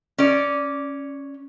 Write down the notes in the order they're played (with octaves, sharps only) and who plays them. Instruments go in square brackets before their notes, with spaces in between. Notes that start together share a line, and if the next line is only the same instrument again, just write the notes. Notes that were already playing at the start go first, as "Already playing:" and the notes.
[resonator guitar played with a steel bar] C#4 D5